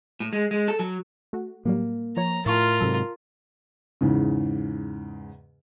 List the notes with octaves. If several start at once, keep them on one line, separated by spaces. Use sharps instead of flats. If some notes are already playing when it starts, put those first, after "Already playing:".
A2
G#3
G#3
A4
F#3
A3 F#4
A2 F#3 G3 A#3
F3 C#5 A#5
A2 F4 A#4 A5 C#6
G#2 C3 F#3 A4
E2 G#2 C#3